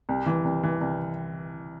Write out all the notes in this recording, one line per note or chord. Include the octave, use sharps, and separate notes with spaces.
C2
E3
C2
E3
C2